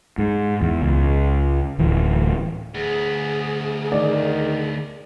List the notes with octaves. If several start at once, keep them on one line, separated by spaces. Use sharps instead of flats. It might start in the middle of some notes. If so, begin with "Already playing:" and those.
G#2
E2
C#2
D1 E3
D2 B3 G#4
D#3 D5